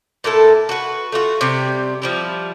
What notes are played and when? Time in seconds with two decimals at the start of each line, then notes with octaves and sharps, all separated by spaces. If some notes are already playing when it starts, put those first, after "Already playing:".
0.24 A#2 A3 E4 A4
0.69 F#4 B4
1.12 A3 F4 F#4
1.41 C3 G3
2.02 F3 G3 E4